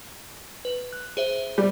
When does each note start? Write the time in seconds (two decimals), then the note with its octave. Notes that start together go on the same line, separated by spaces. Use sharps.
0.65 B4
0.93 F#6
1.17 G#4 C5 E5
1.58 G3